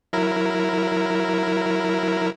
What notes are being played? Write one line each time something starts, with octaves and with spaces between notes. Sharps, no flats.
F#3 E4 A#4